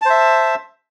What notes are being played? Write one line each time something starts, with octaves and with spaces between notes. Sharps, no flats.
C5 E5 A5